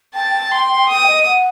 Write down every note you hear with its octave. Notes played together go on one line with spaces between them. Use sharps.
G5 A5
C6
G5 D#6
D#5
F#5